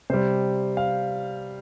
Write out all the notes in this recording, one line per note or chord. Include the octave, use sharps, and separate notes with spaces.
C3 G3 C5
F5